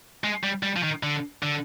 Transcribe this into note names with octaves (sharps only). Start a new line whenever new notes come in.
G#3
G3
G3
F3
D#3
D3
D3